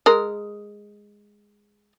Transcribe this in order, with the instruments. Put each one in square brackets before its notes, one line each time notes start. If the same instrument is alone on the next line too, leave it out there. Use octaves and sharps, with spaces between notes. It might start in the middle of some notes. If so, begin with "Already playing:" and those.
[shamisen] G#3 A#4